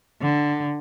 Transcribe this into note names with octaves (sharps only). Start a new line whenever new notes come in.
D3